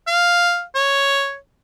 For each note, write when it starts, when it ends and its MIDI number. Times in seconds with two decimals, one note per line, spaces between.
0.07 0.63 77
0.75 1.36 73